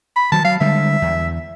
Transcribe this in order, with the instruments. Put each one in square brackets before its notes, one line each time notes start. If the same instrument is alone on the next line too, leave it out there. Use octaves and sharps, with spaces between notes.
[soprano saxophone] B5
[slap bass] D#3 F#3 [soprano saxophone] A5
[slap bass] F#3 [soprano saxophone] F5
[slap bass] D3 G3 G#3 [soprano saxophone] E5
[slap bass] E2